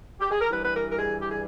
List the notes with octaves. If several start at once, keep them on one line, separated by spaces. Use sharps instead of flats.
G4
G#4
A#4
G2 E3 G3 B4
B4
A#4
A#4
G#4
G4
G#4